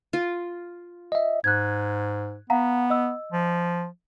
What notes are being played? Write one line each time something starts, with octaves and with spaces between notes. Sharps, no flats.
F4
D#5 E5
G#2 F#6 G#6
B3 F5 F#5 A#5
D#5 E6
F3